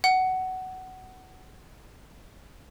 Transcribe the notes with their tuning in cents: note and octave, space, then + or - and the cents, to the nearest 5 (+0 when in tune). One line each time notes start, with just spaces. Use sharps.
F#5 +15